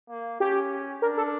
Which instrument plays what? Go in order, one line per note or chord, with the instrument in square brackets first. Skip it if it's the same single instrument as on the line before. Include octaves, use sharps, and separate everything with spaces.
[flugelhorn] A#3
[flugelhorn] C#4 [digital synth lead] G4
[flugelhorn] D4 [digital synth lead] A#4
[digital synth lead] A4